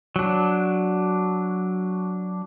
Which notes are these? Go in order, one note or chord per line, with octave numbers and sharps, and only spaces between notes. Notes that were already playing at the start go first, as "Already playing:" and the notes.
F#3 D4